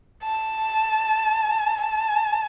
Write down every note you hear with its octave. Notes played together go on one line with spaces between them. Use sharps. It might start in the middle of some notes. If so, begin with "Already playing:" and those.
A5
A5